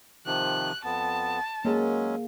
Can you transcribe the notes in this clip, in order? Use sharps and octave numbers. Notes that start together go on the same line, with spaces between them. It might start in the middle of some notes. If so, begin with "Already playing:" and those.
C3 D#3 F3 F#6
F2 B3 A5
F#3 G#3 A#3 C#4 G#4